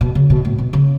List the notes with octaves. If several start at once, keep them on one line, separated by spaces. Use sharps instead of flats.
B2
C#3
B2
A2
B2
C#3